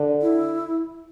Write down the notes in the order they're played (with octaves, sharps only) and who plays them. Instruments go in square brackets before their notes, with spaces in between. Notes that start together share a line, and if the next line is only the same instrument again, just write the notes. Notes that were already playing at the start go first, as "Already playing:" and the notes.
Already playing: [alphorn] D3
[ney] E4